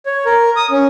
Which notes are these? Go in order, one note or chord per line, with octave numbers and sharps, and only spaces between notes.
C#5
A#4
D#6
C#4